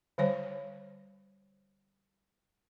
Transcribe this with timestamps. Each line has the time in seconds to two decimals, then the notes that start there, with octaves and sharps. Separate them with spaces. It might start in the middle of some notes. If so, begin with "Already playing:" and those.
0.18 D3 G3 C5 C#5